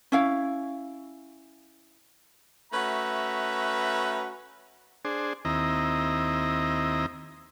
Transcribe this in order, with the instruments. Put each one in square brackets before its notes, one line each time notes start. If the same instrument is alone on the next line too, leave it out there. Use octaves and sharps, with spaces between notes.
[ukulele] C#4 E4 F5
[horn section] A3 C#4 F#4 B4 E5 A#5
[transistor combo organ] D4 G#4 C5
D#2 C4 E4 D#5 A#5